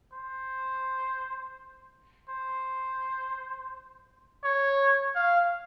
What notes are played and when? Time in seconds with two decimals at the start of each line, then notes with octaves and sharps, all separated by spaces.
0.13 C5
2.29 C5
4.44 C#5
5.15 F5